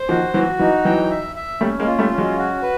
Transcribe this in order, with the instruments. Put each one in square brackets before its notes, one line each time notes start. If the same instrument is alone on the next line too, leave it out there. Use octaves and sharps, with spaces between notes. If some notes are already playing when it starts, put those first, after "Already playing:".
Already playing: [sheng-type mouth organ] C5
[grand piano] D#3 F3 [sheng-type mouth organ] F#4
[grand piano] E3 F#3 [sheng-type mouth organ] F#4
[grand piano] E3 F#3 [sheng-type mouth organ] D#4
[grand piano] E3 F#3 [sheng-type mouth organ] G5
[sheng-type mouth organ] E5
E5
[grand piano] G3 A3 [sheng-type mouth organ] C#4
[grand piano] G#3 A#3
[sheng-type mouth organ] F4
[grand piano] G3 A3
[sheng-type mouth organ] C#4
[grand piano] F#3 G#3
[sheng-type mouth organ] F#4
B4